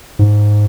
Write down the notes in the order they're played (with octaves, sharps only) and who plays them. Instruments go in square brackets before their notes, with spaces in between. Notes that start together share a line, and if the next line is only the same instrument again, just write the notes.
[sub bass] G#2